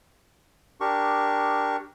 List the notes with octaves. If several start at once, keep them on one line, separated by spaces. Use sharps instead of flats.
D4 G4 A#4 C#6